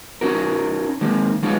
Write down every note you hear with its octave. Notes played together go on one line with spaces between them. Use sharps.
C#4 D#4 F#4 A#4
D#3 G#3 A#3
F3 G#3 B3 C#4 D#4 F4